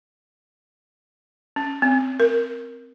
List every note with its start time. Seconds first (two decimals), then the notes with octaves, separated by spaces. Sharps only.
1.56 C#4
1.82 C4
2.20 A#4